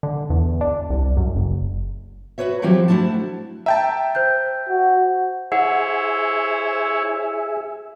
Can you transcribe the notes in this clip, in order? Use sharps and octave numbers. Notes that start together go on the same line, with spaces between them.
D3
E2
D4
C2
F#2
F#1
F#4 A4 B4 C#5 E5
D#3 F3 F#3 C4 E4 G4
A3 D4 E4 F#4 A5
E5 G5 A5 A#5
C5 G6
F#4
E4 G#4 C5 C#5 E5 F#5